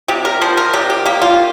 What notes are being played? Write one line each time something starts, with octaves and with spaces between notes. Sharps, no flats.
C3 G4
A#4
F3 C5
A#4
C3 G4
G4
A#3 G4
F4